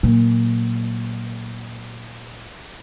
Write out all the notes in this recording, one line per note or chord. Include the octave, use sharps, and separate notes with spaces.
A#2 F#3